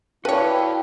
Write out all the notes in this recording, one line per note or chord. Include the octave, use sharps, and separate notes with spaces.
E4 F#4 B4 C#5 D5 F5 G5 A5